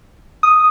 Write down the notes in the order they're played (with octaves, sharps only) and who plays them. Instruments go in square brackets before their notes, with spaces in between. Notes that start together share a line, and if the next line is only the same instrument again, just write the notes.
[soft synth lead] D#6